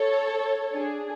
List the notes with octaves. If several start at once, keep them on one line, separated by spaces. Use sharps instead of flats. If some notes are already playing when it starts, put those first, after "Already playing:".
Already playing: A4 C#5
D4 G#4